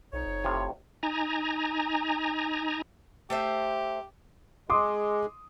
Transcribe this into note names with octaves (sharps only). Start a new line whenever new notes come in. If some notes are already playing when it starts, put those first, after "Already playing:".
B1 F2 D#4 C#5
F#1
A2 C3 F4
D#4 G#5 A#5
A3 G4 C5 E5
G#3 C6 D6 D#6